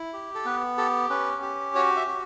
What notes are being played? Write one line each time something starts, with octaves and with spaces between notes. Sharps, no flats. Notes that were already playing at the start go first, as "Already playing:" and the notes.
Already playing: E4
G4
A4
B3 B4
G4 A4
C#4 B4
G4
F#4 C#5
E5
F#4